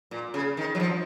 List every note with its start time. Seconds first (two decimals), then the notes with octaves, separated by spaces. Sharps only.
0.11 A#2
0.34 C#3
0.57 D#3
0.75 F#3
0.80 F3